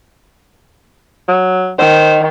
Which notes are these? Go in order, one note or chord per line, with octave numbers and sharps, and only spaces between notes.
F#3
D#3 C5